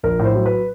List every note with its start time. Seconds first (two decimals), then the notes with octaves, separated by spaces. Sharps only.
0.03 A#1 A#4
0.19 A2
0.25 C5
0.35 F#3
0.46 B4